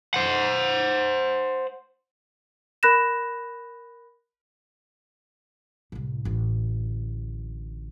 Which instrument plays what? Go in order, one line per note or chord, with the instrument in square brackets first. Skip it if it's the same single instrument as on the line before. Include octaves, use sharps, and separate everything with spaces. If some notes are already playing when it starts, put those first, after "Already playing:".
[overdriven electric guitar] C5 F#5
[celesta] A#4 B5 F#6 A#6 E7
[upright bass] C2 A2
A1 D2